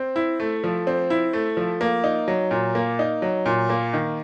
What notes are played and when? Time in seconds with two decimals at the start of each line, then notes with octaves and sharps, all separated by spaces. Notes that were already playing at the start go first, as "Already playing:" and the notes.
Already playing: C4
0.16 E4
0.40 A3
0.64 F3
0.87 C4
1.10 E4
1.33 A3
1.57 F3
1.81 A#3
2.04 D#4
2.28 F#3
2.51 A#2
2.75 A#3
2.99 D#4
3.22 F#3
3.46 A#2
3.70 A#3
3.93 D#3